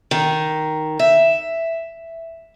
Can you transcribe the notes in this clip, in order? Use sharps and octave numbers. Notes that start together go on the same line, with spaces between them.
D#3
E5